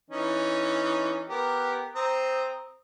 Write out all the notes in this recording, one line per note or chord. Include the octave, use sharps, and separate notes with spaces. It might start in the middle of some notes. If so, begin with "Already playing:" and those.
E3 C#4 D#4
B3 G4 A#4
C4 A#5 D#6